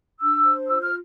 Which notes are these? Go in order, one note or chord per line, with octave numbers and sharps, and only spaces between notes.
D4 E6
C5
F4 E6
F6